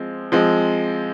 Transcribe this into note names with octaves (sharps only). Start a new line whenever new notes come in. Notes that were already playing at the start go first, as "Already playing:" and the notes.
Already playing: F3 G#3 C4
F3 G#3 C4